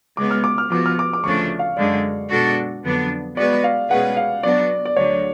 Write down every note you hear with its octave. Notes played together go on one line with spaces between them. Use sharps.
C#3 G#3 B3 D6
F6
D6
F6
F3 B3 F#4 D6
F6
D6
D6
D2 C#3 F3 A3 D4 C#6
F5
F#2 D3 G#3 D5
B2 G#3 D4 F#4 A4
F2 D3 F#3 B3 D4
G#3 B3 F#4 B4 D5
F5
B2 G#3 C#4 G#4 B4 F#5
F5
F#3 B3 D4 F#4 D5
D5
D2 D3 F#3 C#5